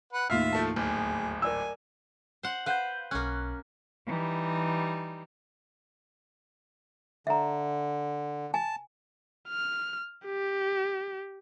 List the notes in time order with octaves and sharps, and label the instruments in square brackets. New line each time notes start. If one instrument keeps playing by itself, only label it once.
[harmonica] B4 F#5
[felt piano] D#2 A2 C7 [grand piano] F4 F6 [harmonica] E5
[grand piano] F3 A3 A5
[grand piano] D1 G#1 [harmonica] G#4
[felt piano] A#4 D5 E6 [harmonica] G#5
[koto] C5 F#5
[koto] B4 C5 [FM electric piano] F5 F#5 G6
[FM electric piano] B1 F#6 [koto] A#3 C#4
[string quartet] E3 G3 D#4
[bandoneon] D3 [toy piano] E5 A#5
[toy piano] G#5 [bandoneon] A5
[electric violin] F6
G4